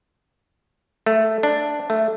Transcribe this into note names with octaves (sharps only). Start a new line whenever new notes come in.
A3
D4
A3